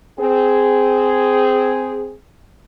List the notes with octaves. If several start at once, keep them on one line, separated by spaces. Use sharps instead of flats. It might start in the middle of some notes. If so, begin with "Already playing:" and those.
C4 G#4